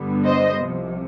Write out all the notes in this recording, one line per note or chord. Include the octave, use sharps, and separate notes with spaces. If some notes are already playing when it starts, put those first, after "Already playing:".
Already playing: G2 D3 G3 B3
C5 D#5
C2 C3 F3